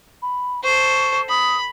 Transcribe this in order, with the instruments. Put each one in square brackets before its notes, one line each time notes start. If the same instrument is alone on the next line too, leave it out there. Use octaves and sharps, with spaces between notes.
[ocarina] B5
[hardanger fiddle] A4 C5 [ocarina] C#6
[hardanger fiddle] B5 [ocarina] D#6